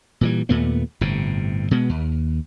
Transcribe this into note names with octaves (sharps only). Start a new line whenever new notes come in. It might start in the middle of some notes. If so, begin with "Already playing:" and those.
A#2 E3 G3
D#2 A#2 A3 B3
G1 A2 C3
B2 G#3 B3
D#2